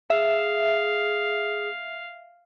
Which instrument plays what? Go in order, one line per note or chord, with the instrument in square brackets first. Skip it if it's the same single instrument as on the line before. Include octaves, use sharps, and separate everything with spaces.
[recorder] G#4 [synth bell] E5 [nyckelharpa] F5